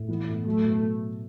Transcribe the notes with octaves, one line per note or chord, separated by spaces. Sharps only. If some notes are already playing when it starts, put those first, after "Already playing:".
Already playing: A2
E3 B3
A2
F#3 A3
B2